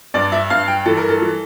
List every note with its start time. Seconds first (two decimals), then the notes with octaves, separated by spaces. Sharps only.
0.14 G2 D5
0.32 E5
0.50 G2 F5
0.68 G5
0.86 E3 A4
0.97 A#4
1.09 A4
1.22 E3